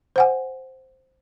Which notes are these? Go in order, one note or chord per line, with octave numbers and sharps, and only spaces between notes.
C5 F#5 G#5